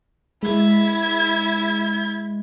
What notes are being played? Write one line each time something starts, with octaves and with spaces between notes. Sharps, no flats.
G#3 E4 G#6